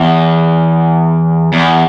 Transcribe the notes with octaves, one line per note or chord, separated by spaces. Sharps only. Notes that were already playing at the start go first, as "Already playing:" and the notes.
Already playing: E2
E2